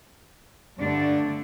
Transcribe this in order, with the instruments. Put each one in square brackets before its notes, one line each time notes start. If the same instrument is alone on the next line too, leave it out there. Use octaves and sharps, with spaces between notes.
[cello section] G2 D3 A3 D4